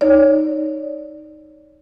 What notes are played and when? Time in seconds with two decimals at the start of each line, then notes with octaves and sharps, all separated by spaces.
0.01 D#4 C#5 D5